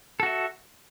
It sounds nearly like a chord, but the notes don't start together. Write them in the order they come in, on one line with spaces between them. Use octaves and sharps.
A4 F#4 E5